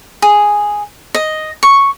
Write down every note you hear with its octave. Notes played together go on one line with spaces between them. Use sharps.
G#4
D#5
C#6